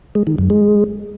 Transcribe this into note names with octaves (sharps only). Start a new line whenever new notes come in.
G#3
D#3
F#2
G#3